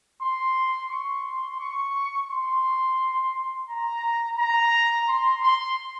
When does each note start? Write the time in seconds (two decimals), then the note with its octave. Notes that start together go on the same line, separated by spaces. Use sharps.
0.22 C6
0.91 C#6
1.26 C6
1.60 C#6
2.30 C6
3.69 A#5
4.39 A#5
5.09 C6
5.43 C6